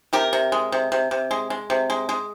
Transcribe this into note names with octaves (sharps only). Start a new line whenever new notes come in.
C3 G4 A#4
C3
G#3
C3
C3
C3
G#3
G#3
C3
G#3
G#3